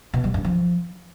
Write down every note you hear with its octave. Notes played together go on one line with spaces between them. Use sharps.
B2
G3
G2
F3